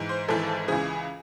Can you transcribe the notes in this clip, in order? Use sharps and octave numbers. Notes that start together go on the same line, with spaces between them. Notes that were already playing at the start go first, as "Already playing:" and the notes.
Already playing: G#2 E3
C5
G#1 G#2 E3 A4
C#2 C#3 E3 G#4